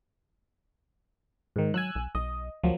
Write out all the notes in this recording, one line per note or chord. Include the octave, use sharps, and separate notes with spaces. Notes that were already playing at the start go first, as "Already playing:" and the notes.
G#2 D#3
F#3 G#5 E6 F#6
B1
B1 D#5
D2 F3 F#3 A#3